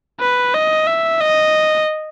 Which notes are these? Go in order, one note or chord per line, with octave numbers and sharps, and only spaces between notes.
B4
D#5
E5
D#5